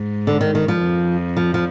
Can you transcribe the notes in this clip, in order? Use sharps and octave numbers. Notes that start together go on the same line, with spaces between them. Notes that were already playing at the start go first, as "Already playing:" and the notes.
Already playing: G#2
D3
D#3
D#3
F3
F2
F3
F3